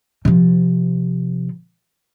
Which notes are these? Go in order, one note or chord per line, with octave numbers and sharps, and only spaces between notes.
C3 F3